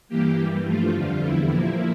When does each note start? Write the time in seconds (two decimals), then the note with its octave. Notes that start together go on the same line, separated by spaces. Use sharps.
0.08 G2 E3 A#3 G4
0.38 G2 E3 G3
0.66 G2 F3 A3 F4
0.94 F2 D3 G3
1.23 E2 D3 G3 E4
1.51 A#2 F3 A#3 E4